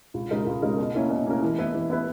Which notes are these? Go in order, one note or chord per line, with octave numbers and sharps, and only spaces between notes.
C#2
C#3 G#3 D#4 A#4
C#2
C#3 G#3 D#4 A#4
B2
A#3 C#4 E4 A#4
B2
A#3 C#4 E4 A#4
E3
B3 E4 B4
E3
B3 E4 B4